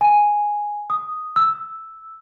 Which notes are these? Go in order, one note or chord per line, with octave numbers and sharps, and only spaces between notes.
G#5
D#6
E6